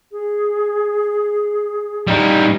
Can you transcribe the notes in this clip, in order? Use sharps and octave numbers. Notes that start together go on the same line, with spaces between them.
G#4
G3 D#4